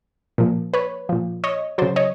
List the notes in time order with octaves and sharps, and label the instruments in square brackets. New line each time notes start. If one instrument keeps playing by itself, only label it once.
[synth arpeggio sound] A#2 F3
B4 C#5
A#2 F3
C#5 D#5
C#3 F#3 C5 D5
C#5 D#5